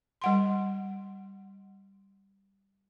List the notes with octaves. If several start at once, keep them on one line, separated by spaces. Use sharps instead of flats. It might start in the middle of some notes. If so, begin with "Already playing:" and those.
G3 F#5 C6